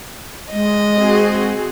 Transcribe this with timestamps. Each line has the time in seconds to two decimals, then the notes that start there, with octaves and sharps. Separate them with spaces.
0.52 G#3 D#5
0.97 C4 F#4 G#4